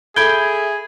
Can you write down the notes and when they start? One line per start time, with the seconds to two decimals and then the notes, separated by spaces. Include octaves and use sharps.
0.16 G#4 A4 E5 B5 G6 G#6 D7 G7